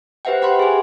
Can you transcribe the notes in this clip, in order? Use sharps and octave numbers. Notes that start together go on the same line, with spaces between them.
G4 B4 C5 E5 F#5 G5
G4 F#5 B5 C6
G#4 G#5